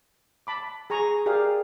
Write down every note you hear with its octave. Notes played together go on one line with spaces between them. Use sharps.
A5 B5 D6
G#4 G#5 A#5 C#6
G4 G#4 A#4 D5 F5